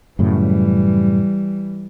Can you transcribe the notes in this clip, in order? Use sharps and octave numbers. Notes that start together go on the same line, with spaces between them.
F#2 A2 C#3 E3 G3